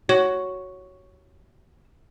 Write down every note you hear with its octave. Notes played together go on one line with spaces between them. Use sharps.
F#4 C#5